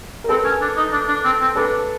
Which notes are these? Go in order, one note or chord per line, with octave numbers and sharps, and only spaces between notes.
A#4
C4 A4 B4
C#4
D4
D#4
D4
D4
C4
C4
D4 A4 B4